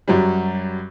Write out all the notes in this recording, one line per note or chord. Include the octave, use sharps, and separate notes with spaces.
F#2 F#3 G3